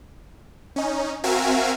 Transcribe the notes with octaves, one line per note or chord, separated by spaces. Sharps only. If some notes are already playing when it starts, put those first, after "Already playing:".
C#4 D#4
C4 F#4 A#4 E5 F5 G#5